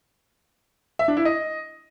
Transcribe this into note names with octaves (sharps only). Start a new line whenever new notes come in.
E5
D4
E4
D#5